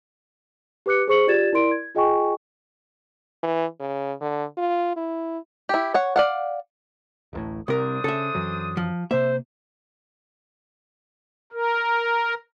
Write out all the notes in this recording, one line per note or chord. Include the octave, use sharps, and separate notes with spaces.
G4 B4 D6 F#6 C#7
G#4 C5 C#6 C#7 F#7
F4 G4 D5 G#6 A6 E7
E4 A#4 D5 C6 D7
G#6
F4 G#4 D#5 G5 G#5 C#6
E3
C#3
D3
F4
E4
E4 G4
C#5 F#5
D5 F5 F#5
D1 A1 A2
C2 C3 D4 A#4 C5 D#6
C#3 A4 E5
F#2 E3 F#3
F3
C3 A#3 C5 E5
A#4